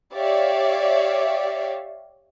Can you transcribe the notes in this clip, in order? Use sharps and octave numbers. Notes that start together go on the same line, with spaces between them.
G4 C#5 D5 E5 F5